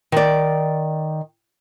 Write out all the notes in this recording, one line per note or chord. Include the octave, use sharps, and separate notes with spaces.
D#3 D5